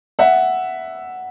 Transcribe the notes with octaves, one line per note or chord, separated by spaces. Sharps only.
E5 F#5